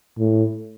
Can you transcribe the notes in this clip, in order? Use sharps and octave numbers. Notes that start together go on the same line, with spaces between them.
A2